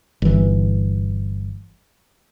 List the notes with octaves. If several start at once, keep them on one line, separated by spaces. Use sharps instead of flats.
G1 E3